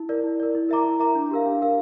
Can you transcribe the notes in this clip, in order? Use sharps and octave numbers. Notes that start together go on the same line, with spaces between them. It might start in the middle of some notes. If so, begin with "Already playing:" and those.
Already playing: E4
A#4 D5
E4
A#4 D5
E4
A#4 E5 A#5 D6
E4
A#4 E5 A#5 D6
D4
G4 A#4 F5
D4
G4 A#4 F5